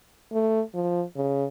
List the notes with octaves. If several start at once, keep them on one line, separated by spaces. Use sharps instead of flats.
A3
F3
C#3